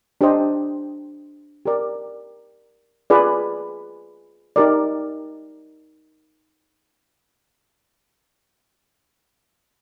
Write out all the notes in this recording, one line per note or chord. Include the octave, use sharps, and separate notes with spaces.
D4 G4 C5 D#5
G4 A#4 D5
F4 G#4 B4 D5
D#4 G4 A#4 D5